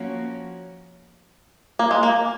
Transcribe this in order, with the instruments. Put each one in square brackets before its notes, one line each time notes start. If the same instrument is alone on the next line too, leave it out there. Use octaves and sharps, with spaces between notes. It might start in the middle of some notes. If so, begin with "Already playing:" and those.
Already playing: [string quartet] F3 A#3 C#4 F#4 C#5
[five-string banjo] A#3
G#3
A#3